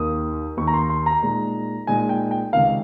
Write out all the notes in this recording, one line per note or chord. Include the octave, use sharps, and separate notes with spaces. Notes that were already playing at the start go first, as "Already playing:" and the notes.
Already playing: D#2 D#3 A#3 D#4 D#6
D#2 D#3 A#3 D#4 C#6
A#5
C6
C6
A#5
A#2 G#3 D#4
A#2 G#3 D#4 G#5
G5
G5
C#2 C3 D#3 F5